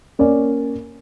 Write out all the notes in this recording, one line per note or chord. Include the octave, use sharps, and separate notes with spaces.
A#3 C#4 D5